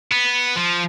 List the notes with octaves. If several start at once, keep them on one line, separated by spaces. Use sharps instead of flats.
B3
F3